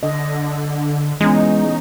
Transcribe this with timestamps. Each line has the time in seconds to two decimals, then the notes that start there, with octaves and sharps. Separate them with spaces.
0.03 D3 D#5
1.20 E3 G#3 B3 C#4 D#4